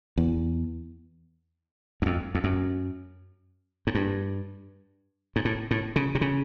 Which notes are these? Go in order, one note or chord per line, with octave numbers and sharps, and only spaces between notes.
E2
E2
F2
F2
F#2
G#2
G2
G#2
A2
A2
C#3
C3
C#3